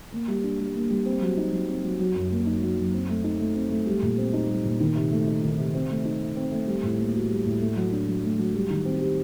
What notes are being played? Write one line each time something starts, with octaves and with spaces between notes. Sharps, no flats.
A#3
G3
D4
G3
A#3
G3
C4
F#3
D#4
F#3
C4
F#3
F#3
F#2
A#3
D#4
F#3
F#2
C4
A3
D#4
A3
C4
A3
G3
A#2
C4
D#4
G3
A#2
D#3
C3
A3
D#4
D#3
C3
C4
A3
D#4
A3
C4
A3
G3
A2
A#3
F#4
G3
A2
A3
F#3
D4
F#3
A3
F#3
G3
D#3
C4
G4